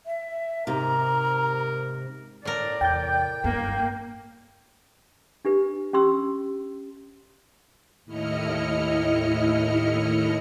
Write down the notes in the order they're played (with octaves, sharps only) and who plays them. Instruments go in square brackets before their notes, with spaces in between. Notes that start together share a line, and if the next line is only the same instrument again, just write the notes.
[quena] E5
[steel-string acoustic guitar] G#2 C3 [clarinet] A#4 [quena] A#5
[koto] A2 A#4 [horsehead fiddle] D5
[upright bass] E2 C3 [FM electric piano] G5 G6
[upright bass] F#1 G2 [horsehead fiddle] A#3
[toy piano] D4 G4 B4
C#4 G4 C6 E6
[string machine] D#2 A2 E4 D#5 F6 C#7